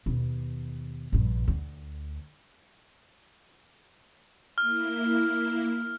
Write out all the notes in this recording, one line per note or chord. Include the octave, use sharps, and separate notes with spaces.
D#2 B2
A#1 G2
D2
A#3 E4 F6